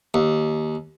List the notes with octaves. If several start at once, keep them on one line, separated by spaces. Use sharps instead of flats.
D#2